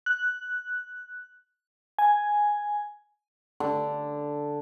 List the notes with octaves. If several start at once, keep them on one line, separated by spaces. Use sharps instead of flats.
F#6
G#5
D3